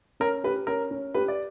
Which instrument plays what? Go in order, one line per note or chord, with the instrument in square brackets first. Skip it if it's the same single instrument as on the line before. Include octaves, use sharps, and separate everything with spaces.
[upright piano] C#4 [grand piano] A#4
[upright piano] G4 [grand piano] B4
[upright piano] C#4 [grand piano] A#4
[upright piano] C#4
[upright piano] G4 [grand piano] B4
[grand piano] D5